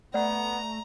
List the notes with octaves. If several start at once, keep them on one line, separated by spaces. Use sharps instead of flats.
A3 B3 D5 F#5 A#5